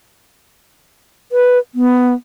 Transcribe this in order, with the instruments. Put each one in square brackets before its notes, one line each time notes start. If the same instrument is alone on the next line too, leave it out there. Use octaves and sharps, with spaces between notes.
[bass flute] B4
B3